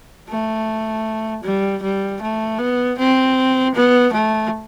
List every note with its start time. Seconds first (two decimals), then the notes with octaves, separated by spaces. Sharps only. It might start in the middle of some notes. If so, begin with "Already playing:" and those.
0.30 A3
1.44 G3
1.83 G3
2.22 A3
2.59 B3
2.98 C4
3.75 B3
4.13 A3